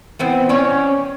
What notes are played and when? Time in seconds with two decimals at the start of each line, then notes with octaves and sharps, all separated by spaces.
0.19 E3 B3 C4
0.49 C#4 C#5 D5